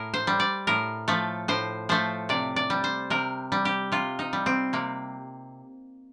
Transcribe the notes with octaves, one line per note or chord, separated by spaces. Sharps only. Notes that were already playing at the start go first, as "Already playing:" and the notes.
Already playing: A2 A#4
C5
G3
D5
A2 A#4
F3 A3
A2 C5
F3 A3 C5
C3 D5
D5
G3
C5
C3 A#4
G3
G4
C3 F4
D#4
G3
C4
C3 A#3